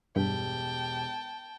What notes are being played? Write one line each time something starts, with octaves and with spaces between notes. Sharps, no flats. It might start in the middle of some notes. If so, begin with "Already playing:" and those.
E1 G2 G4 G5 A5